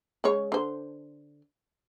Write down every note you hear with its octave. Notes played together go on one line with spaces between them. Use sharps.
C#3 G#3 C#5
D3 C5